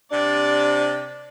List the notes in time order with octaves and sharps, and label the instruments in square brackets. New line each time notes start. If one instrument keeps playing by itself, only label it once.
[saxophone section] C3 [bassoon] D4 [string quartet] D5